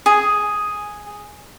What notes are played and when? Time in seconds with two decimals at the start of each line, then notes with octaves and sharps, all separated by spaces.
0.06 G#4